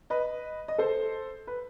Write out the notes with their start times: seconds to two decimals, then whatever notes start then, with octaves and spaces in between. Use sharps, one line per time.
0.10 B4 D#5
0.68 D#5
0.78 A4 C5
1.47 B4